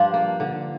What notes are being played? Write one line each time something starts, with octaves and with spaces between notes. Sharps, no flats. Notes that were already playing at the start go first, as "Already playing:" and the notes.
Already playing: G2 F3 D4 F4 G4
A#3
D3